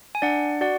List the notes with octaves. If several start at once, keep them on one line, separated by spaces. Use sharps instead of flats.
G#5
D4 D5 F#5
F#4 D5 F#5